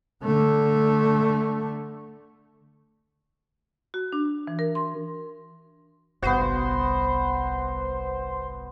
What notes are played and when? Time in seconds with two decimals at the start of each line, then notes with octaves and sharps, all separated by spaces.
0.23 D3 A3
3.94 F#4
4.12 D4
4.47 E3
4.59 A#4
4.75 C6
6.22 G1 C2 B3 F#4 C5